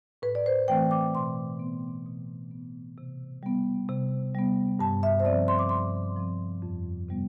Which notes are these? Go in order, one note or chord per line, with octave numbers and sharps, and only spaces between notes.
A2 B4
D5
C5
E3 A3 C4 G5
D6
B2 C6
B3
B2
B3
C3
G3 B3
C3
G3 B3
G2 A5
E5
C5
F3 C4 D5
C6
D6
G2 C6
F3 C4
F2
C3 G3 B3